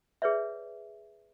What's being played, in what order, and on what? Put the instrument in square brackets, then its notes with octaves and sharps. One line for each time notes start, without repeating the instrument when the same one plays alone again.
[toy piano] G#4 B4 C#5 D5 E5